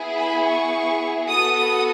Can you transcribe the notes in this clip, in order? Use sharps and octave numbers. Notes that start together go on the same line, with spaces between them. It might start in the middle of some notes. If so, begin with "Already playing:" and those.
Already playing: B3 E4 G#4
B5
C#6
B3 F#4 A4 D#6
D#6